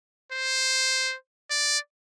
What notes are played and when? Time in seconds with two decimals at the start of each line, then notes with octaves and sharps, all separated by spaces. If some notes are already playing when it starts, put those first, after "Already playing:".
0.32 C5
1.50 D5